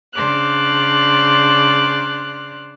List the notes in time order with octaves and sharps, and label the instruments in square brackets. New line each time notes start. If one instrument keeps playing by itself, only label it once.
[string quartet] C#3 D4 C5 D5 F6 F#6